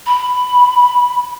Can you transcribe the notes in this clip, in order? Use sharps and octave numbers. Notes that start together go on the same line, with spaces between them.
B5